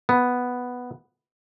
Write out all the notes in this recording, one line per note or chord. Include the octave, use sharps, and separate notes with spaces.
B3